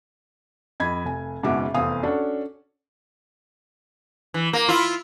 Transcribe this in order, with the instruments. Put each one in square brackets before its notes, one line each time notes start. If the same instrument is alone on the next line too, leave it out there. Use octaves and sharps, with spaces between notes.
[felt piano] F2 D#5 B5 G#6
F1 G#5
F#1 G#2 B2 F#4 E5 D6
F1 E2 C4 F5 G#5 D#6
C#4 D4 F#4 A4
[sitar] E3
A#3
E4 F4